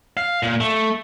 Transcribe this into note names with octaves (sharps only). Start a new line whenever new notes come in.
F5
A#2
A3